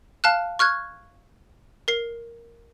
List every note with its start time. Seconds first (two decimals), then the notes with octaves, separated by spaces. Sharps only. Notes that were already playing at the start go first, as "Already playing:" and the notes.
0.24 F5 A5 F6 F#6
0.59 C#6 F6 F#6 G#6
1.88 A#4 C7